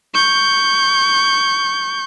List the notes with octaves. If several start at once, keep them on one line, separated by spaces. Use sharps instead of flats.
C#6 G6